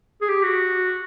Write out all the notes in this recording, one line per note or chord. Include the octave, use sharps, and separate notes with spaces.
G#4
G4
F#4